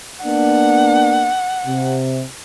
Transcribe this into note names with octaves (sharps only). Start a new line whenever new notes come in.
A#3 B3 D4 F#5
C3